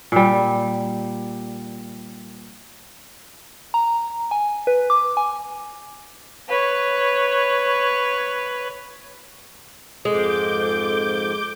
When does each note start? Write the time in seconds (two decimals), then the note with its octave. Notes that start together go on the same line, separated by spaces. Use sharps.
0.12 A#2 G3
3.74 A#5
4.31 G#5
4.67 B4
4.90 D6
5.17 G#5
6.49 B4 C#5
10.05 F2 G#2 G#3 A4 D6 G6